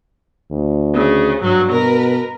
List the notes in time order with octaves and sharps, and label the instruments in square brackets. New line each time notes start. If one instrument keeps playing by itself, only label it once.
[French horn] D2
[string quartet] C#3
G2 F#3
[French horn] B2 [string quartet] A#4 B4